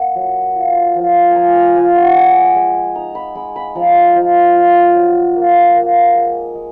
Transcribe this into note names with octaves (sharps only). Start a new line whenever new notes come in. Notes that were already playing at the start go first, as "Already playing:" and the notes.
Already playing: A#3 F#5
F#3
F4
F3
F3 G#5 A#5
A#5
F3 G#5
F#5
G#3 G#5
G#3
D#4 A#5
B5
G#3 B5
B5
F3 A#5
F3
F4
F#3
A#3
A#3
G#3
G#3